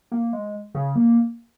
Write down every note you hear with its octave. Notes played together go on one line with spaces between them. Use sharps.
A#3
G#3
C#3
A#3